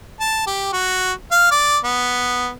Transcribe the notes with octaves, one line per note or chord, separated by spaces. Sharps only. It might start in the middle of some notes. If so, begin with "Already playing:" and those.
A5
G4
F#4
F5
D5
B3